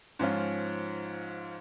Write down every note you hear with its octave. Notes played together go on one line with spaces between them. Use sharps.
G#2 F3 C#4 F4